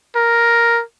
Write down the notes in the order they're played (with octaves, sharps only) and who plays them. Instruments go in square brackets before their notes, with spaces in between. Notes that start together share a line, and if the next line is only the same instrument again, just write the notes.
[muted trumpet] A#4